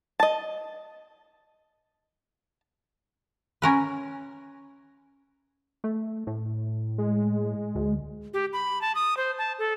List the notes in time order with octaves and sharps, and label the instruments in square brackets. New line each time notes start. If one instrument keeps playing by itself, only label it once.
[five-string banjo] D#5 A5
[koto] C#4 A#4 B4
[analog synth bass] A3
A2
[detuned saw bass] G#3
[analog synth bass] D2
[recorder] G4
B5
A5
D#6
C5
A5
A4